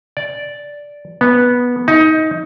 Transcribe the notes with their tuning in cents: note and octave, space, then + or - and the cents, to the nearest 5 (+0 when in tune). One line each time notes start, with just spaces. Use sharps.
D5 -5
B3 -10
D#4 +20